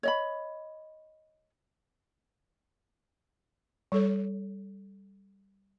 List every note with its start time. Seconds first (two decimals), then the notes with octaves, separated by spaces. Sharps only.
0.03 C#5 D#5 B5
3.92 G3 A4 C#5